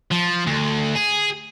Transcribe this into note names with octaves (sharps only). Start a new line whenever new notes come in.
F3
D2
G#4